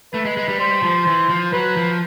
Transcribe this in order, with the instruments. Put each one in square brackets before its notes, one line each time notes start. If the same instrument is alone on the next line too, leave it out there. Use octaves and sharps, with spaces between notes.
[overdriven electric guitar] A3 [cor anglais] B4
[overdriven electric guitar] G#3
G#3
G3
[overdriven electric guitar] G3 [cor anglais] C5
[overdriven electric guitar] F3
E3
F3
[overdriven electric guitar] F#3 [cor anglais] B4
[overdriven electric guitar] F3